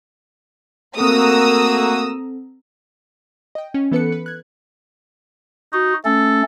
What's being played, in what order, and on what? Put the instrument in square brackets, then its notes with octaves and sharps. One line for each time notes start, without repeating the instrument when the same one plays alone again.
[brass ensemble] A3 A#3 F#4 [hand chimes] C4 A4 [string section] A#5 D#6 E6
[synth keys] D#5 G5
C#4
E3 B3 A4 B4 F#6 C#7
B4
F#6 G#6
[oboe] D#4 [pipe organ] F#4
[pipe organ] A3 C#4 [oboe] A4